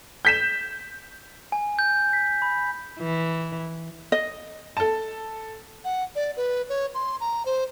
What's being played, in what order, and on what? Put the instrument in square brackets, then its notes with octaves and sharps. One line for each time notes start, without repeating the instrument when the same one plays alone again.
[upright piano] G6 B6 E7
[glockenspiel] G#5
G6
B6
B5
[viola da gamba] E3
[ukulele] D#5
[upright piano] A4 A5
[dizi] F#5
D5
B4
C#5
C6
A#5
C5